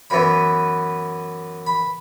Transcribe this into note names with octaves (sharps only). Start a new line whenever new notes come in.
F#2 E3 B3 B5
B5